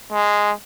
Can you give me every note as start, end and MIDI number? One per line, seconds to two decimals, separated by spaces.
0.13 0.52 56